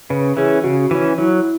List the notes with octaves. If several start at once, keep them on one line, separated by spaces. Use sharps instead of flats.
C#3 B4
E3 C#4 G#4
C#3 F#4
E3 C#4
F#3 E4